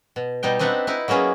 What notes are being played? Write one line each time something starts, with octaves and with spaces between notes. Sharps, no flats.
B2
B2 G3 D#4 G5
C4 D4 D#4 B4 E5 F#5
D#4 E4 B4
F#3 A#3 B3 C#4 G#4